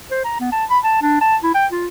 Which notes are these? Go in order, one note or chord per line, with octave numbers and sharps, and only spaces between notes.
C5
A#5
B3
A5
B5
A5
D4
A5
E4
G5
F4